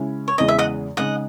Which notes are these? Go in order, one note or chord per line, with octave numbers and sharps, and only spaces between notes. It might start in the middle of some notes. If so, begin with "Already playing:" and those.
Already playing: C#3 G#3 C#4 E4
C#5
E2 C#3 E3 G#3 D#5
E5
D#5 F#5
C#3 G#3 D#4 D#5 F#5